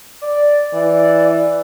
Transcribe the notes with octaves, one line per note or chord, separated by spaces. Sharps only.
D5
E3